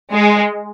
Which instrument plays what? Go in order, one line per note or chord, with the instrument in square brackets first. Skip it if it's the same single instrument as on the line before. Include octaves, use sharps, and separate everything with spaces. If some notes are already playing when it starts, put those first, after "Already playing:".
[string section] G#3